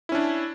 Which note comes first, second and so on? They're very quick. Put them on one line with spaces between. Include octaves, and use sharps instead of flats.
E4 C#4 D4